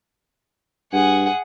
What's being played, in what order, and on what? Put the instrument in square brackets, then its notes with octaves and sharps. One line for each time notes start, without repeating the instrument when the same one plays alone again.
[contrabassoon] G2 [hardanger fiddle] G#4 F#5